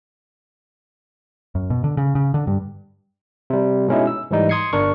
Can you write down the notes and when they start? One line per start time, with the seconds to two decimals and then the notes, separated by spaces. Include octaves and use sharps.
1.55 F#2
1.70 B2
1.84 D3
1.97 C#3
2.15 C#3
2.34 D3
2.47 G2
3.50 C3 G3
3.88 B2 G#3 C#4 D#4 E4
4.07 E6
4.31 G#2 E3 G3 D#4
4.49 C6 D#6 G#6 C7 C#7
4.73 G1 D4 A#4 C#6